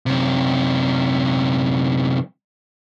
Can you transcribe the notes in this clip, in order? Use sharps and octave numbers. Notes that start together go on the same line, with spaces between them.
F#2 C3